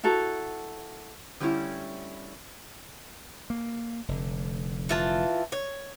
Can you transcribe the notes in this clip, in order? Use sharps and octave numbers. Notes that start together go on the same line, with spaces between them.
E4 F#4 A4 A#5
D3 G3 A3 C#4 E4
A#3
F1 D3
E3 F4 A5
C#5